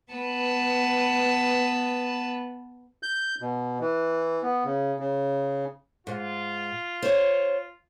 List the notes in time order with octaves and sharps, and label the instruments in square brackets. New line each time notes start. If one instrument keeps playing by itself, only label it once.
[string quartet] B3 B4 A5
[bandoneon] G6
B2
E3
B3
C#3
C#3
[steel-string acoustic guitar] G#2 [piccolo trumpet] F4
[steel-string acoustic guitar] C5 C#5